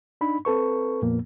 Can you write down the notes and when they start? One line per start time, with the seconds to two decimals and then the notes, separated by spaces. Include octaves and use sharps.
0.21 D4 D#4 B5
0.45 C4 A4 B4 C#6
1.02 F2 A#2 F3 A#3 B3